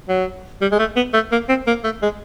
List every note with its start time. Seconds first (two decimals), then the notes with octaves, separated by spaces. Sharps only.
0.09 F#3
0.61 G3
0.72 G#3
0.79 A3
0.96 B3
1.14 A3
1.32 A#3
1.49 C4
1.67 A#3
1.84 A3
2.03 G#3